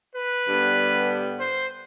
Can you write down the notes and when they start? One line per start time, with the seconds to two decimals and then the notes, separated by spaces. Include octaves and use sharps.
0.15 B4
0.46 G2 D3 G3 B3
1.39 C5